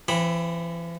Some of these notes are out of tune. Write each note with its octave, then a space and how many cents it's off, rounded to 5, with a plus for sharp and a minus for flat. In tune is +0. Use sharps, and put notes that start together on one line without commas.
E3 +40 C4 +20 B5 +0